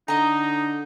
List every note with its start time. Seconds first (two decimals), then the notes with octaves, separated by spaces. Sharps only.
0.08 D3 D#4 D#5 A#5